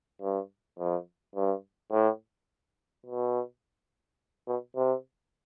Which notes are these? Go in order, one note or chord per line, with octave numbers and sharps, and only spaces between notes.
G2
F2
G2
A2
B2
B2
C3